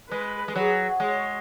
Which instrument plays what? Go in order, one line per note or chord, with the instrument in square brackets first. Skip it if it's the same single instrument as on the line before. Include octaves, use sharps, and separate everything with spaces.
[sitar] G#3 [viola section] B4
[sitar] G#3
[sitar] F#3 [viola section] G#4
[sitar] G#3 [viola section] C#5